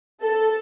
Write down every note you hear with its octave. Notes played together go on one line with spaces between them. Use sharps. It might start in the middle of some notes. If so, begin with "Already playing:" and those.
A4